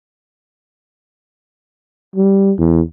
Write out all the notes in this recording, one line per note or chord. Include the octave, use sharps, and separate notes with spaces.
G3
E2